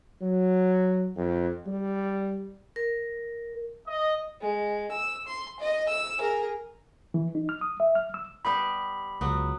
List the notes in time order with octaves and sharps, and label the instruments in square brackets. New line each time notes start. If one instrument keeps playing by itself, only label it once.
[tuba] F#3
F2
G3
[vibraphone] A#4
[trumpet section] D#5
[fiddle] G#3
E6
C6
D#5
E6
G#4 A#4
[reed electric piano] E3
D#4
F6
D#6
E5
F6
E6
[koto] G3 B3 G4 [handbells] B5
[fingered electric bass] C#2 [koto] F#3 B3